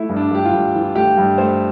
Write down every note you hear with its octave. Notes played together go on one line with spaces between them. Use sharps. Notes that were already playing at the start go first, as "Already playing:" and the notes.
Already playing: A3 E4
G2
D4
G2 G4
F4
G2
E3
A3 G4
G2
A3 C5